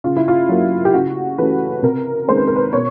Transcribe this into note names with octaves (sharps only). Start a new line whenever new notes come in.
C#3 F4
E4
F4
F#3 A#3
G4
C#3 F#4
E3 A3 C#4 B4
C3 A#4
D#3 G#3 C#4 C5
B4
A#4
B4
B2 C#5